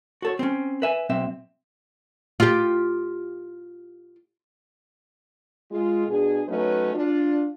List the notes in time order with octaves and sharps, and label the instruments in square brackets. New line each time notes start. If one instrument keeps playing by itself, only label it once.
[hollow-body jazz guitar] F#4 A4 C#5
C4 C#4
B4 E5 G#5
B1 C4 E5
[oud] F4 G4
[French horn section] G#3 F4
B2 D4 G#4
F#3 A3 C#4 D#4 B4
D4 F4